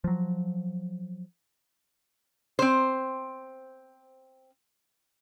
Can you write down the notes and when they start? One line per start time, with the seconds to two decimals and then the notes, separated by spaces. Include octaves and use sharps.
0.04 F3 F#3
2.59 C4 C5